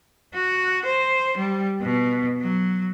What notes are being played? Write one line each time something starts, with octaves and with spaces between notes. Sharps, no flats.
F#4
C5
G3
B2
F#3